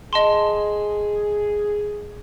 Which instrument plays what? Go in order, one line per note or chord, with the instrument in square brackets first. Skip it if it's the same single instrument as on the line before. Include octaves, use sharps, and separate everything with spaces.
[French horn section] G#4 [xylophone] D#5 A5 C6